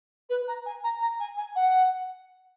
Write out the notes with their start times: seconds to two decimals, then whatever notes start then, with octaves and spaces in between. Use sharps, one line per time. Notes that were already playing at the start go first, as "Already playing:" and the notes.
0.29 B4
0.48 A#5
0.66 G#5
0.84 A#5
1.01 A#5
1.20 G#5
1.37 G#5
1.56 F#5